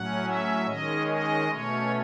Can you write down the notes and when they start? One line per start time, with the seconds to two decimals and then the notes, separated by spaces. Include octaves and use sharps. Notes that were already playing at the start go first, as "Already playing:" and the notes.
Already playing: A2 F#3 C#4 F#5
0.24 E5
0.66 D#3 G#3 C#4 D#5
1.07 D#5
1.48 B2 A3 C#4 C#5